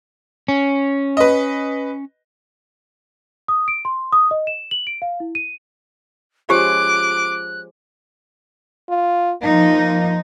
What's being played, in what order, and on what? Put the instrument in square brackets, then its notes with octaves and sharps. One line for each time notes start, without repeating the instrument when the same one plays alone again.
[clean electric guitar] C#4
[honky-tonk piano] B4 D#5
[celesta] D#6
D7
C6
D#6
D#5
E7
F#7
D7
F5
E4
D#7
[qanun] F3 G#3 C#4 [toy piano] G4 [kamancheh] D6 [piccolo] F#6
[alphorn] F4
[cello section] F3 D#4 [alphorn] A#3